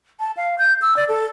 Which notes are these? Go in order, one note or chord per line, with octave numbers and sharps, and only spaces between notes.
A5
F5
G6
E6
D5
A4